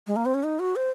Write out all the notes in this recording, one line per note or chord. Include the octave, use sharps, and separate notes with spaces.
G#3
A#3
C4
C#4
D#4
F#4
C5